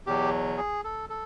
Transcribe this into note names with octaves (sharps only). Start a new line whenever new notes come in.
E2 B2 F#3 G4
G#4
A4
A4